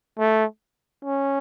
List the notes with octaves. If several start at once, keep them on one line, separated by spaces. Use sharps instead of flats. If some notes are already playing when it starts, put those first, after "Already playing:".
A3
C#4